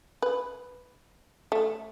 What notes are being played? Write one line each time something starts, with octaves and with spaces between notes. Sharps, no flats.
B4
A3